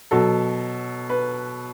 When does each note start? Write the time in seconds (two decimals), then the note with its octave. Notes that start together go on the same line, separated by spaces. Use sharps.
0.11 B2 F#3 A4
1.10 B4